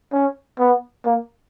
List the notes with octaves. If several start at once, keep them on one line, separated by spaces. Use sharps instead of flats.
C#4
B3
A#3